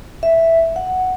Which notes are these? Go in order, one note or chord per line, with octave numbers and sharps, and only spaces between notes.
E5
F#5